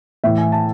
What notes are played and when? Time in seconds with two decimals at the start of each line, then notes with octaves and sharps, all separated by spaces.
0.24 A2 E3 E5
0.38 G#5
0.52 A5